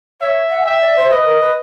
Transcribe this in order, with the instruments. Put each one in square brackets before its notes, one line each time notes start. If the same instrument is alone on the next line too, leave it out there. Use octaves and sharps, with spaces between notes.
[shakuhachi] C#5 [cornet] E5
[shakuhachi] F#5
G#5
[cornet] E5 [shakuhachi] G5
[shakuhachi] D5
C5
[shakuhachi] B4 [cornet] D#5
[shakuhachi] A#4
B4